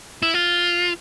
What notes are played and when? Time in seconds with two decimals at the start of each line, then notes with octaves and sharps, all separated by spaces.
0.23 E4
0.34 F4